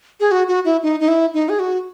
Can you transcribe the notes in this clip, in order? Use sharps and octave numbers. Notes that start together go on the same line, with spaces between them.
G#4
F#4
F#4
E4
D#4
D#4
E4
D#4
G#4
F#4